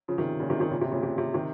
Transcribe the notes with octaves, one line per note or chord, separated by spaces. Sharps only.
C#3 F3
C3 D#3
A#2 C#3
C3 D#3
C3 D#3
A#2 C#3
C3
A#2 C#3
C3
C3
C3 D#3